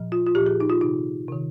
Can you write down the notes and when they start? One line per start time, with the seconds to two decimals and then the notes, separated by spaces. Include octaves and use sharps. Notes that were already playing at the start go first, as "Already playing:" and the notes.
Already playing: A#2 F3
0.12 F4
0.27 F4
0.35 A#2 F3 G4
0.46 G#4
0.60 D#4
0.70 F4
0.81 C3 D#3 D#4
1.28 C3 D#3